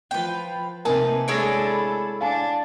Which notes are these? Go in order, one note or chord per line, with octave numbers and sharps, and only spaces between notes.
F3 B4 G5
C3 A#3 D#4 A#4 B4 G#5 A5
G#3 D4 E4 G#4 A4 C#5 A#6 D7
B5
D4 F5 G#5 A5